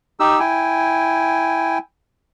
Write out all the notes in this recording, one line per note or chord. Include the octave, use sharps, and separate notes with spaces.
D#4 G4 E6
E4 G5 G#5